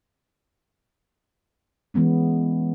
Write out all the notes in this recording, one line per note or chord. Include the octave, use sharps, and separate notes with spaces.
E3 G#3 B3 C#4